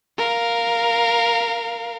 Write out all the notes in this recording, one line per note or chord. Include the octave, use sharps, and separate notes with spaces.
A#4 F5